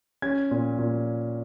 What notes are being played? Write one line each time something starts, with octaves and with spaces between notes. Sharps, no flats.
C#4 G#6
A#2
A#2